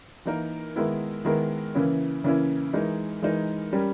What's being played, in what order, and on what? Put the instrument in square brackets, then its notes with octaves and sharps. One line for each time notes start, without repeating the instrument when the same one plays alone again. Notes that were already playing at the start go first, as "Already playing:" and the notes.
[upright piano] E3 A#3 D#4 A#4
D#3 G#3 B3 E4 A#4
D#3 G#3 B3 E4 A#4
C#3 E3 A#3 C#4 E4
C#3 E3 A#3 C#4 E4
E3 G#3 D#4 A#4
E3 G#3 D#4 A#4
G3 C#4 G4 A#4